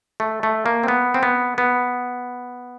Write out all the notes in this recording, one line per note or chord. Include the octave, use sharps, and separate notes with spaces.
A3
A3
A#3
C4
B3
C4
B3
B3